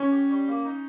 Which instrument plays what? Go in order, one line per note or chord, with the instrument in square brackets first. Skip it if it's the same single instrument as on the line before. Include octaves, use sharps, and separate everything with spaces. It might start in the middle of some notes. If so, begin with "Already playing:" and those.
Already playing: [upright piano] C#4 [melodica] C#5
[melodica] G4
G3
A#3
D#4